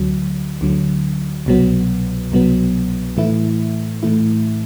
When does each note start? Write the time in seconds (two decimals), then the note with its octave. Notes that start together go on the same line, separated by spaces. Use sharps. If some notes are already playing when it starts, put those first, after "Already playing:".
Already playing: D2 D3 F#3
0.61 D2 D3 F#3
1.46 C2 B2 F#3 B3
2.32 C2 B2 F#3 B3
3.17 A2 E3 A3 E4
4.03 A2 E3 A3 E4